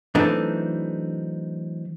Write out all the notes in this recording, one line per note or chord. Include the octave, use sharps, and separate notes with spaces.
E3 F#3 A3 C4 D4 D#4